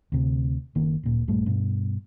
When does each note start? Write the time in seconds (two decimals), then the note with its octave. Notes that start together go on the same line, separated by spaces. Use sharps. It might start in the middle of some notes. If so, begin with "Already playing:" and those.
0.12 D2 C3
0.75 F#1 D#3 A#3
1.03 D1 A#2
1.28 A#1 G2 G3 A3
1.46 G2 B2